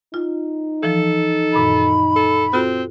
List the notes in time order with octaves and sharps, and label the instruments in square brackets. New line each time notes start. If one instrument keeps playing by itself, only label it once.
[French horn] D#4 [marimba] F4
[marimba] E3 F3 [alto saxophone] A4
[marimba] F#2 A#2 D#3 [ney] B5
[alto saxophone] A4
[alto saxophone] C4 [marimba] F4 F#4 A4